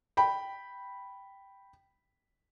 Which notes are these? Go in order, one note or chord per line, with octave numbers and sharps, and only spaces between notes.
G5 B5